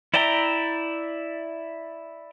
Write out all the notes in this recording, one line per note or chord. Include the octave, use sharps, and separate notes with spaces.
E4 D5 E5 G5 A#5